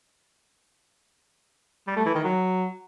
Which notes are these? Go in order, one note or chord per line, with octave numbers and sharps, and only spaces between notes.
G3
A3
E3
D#3
F#3